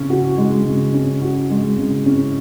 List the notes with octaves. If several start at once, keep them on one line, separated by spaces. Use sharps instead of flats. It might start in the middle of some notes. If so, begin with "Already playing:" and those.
Already playing: C#3 C#4
F#4
G#3
C#3
C#4
F#4
G#3
C#3
C#4